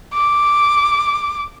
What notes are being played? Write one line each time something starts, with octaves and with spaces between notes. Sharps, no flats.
D6